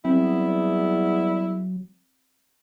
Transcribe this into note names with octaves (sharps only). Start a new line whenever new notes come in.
E2 F#3 G3 B3 C4 E4